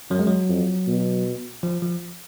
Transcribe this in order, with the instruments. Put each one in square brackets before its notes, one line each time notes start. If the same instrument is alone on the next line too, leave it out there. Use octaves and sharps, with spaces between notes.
[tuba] F#2 [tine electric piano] F#3
[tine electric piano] G#3
F#3
[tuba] F2
B2
[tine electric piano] F3
F3